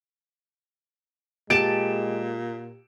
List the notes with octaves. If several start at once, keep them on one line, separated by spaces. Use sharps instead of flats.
A#2 G#3 G4 A5 D7 E7